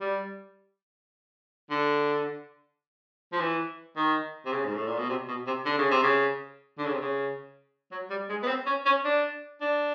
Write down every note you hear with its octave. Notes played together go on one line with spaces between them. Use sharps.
G3
D3
F3
E3
D#3
C3
C#3
G#2
A2
A#2
B2
C3
B2
C3
D3
C#3
C3
C#3
D3
C#3
C3
C#3
F#3
G3
G#3
B3
C4
C#4
C#4
D4
D4